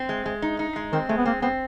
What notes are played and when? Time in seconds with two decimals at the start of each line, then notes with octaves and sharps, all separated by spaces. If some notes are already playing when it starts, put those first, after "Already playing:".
Already playing: C4
0.09 G#3
0.26 G#3
0.42 D#4
0.59 D#4
0.76 G#3
0.93 D#3 C4
1.09 G#3 A3
1.17 B3
1.25 A#3 C4
1.42 B3 C4